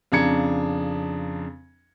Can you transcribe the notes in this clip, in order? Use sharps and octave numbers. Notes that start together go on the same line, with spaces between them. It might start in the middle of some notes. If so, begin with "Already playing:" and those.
F2 C#3 D4 A#5 G#6 C#7